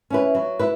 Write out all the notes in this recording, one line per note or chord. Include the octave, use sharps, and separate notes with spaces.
C#4 E4 B4
F#3
E4 B4